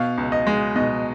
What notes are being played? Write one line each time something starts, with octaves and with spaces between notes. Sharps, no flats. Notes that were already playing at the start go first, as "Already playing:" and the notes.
Already playing: B2 F5
C#2
D#5
G#3
B2 D#5